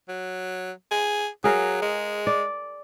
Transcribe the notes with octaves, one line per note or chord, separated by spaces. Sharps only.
F#3
G#4
F#3 G#4 A#4 F5
G#3
D5